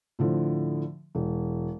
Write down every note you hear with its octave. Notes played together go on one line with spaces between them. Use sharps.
A2 D3 F3
E1